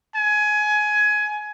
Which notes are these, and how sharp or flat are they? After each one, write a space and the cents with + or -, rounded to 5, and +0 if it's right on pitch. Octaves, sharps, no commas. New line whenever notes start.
G#5 +20